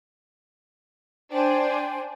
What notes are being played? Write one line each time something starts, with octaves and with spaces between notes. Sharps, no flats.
D4 C5 G5 G#5